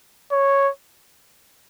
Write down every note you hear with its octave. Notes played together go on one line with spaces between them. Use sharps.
C#5